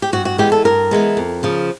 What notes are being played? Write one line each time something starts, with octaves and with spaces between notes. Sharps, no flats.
G4
G2 F#4
F#4
E3 G#3 B3 G4
A4
G2 A#4
E3 G#3 B3
F2
C#3 F3